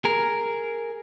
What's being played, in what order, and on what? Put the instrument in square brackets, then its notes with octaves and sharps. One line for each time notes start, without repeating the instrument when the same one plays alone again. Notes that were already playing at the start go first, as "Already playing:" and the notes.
[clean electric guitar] G#4 A#4